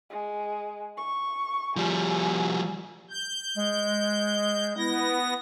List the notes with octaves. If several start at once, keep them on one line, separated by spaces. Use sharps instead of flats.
G#3
C#6
F3 G3 G#5
G6
G#3
B3 E4 A#6